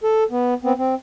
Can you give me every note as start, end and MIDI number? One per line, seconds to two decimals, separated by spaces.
0.04 0.24 69
0.31 0.54 59
0.64 0.73 59
0.64 0.73 60
0.78 0.95 60